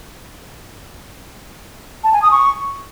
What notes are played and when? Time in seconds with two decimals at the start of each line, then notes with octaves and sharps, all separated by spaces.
2.04 A5
2.13 G#5
2.22 D#6
2.31 C#6